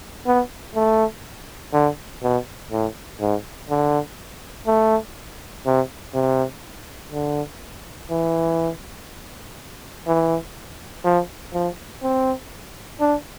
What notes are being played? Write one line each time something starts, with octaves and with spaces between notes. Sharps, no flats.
B3
A3
D3
B2
A2
G#2
D3
A3
C3
C3
D3
E3
E3
F3
F3
C4
D4